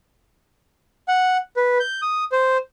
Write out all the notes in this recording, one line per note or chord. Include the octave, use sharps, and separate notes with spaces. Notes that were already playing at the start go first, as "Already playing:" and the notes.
F#5
B4
G6
D#6
C5